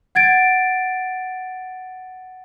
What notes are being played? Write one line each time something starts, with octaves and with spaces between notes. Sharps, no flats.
F#5 G#6 A6 D7